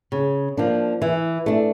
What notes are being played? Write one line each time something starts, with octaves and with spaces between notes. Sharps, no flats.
C#3
F3 A#3 D4
E3
A3 D4